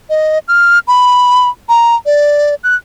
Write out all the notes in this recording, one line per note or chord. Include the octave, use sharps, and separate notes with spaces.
D#5
F6
B5
A#5
D5
F#6